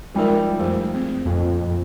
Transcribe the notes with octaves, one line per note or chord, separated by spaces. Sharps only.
F3 G3 G#3 D#4 E4 A#4
F2 A3 G#4 C5
C4
F2 A#2